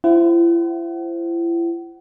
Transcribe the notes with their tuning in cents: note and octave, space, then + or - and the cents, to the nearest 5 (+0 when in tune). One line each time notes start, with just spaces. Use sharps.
E4 +40 C5 +0 F#5 +40